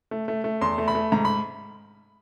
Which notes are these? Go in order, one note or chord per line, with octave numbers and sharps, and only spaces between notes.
A3
A3
A3
E2 C6
A3
B5
A3
G#2 A#5
B5